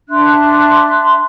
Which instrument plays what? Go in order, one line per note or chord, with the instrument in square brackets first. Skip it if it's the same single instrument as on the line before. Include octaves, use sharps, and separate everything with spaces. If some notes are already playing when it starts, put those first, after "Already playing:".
[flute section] D4 E5 C6 F#6